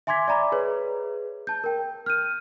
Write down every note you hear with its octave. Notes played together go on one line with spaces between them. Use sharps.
E5 G#5 C6 D6 G#6 B6
D5 E5 A#5 B5 D6
G#4 B4 C#5
A5 G6
A#4 G5
F6 G6 D#7